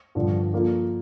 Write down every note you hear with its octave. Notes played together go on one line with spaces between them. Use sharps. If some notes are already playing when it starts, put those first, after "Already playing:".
G2 D3 F3
F3 A#3 F4 A4